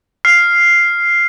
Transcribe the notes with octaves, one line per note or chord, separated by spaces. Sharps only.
F6 C7